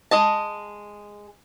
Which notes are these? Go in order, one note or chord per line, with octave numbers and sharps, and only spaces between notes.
G#3 D#5 A5